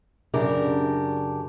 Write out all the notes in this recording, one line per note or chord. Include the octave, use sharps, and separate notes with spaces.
F#2 C#3 D4 G4 A#4